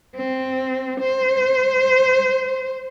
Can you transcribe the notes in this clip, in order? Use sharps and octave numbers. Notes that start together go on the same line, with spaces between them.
C4
C5